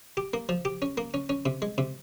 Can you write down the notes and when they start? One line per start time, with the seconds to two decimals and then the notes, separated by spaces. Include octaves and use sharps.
0.17 G4
0.33 A#3
0.49 F3
0.65 G4
0.82 C#4
0.97 A#3
1.14 C#4
1.29 C#4
1.46 C3
1.62 G#3
1.78 C3